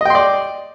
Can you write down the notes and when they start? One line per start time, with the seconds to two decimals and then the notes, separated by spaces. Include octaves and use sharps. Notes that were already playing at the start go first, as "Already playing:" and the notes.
0.01 D#5
0.05 G5
0.10 C6
0.15 D5